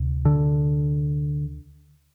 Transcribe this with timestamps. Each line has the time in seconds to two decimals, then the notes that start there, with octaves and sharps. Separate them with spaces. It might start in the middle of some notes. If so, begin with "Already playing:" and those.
Already playing: D2 C3
0.25 D3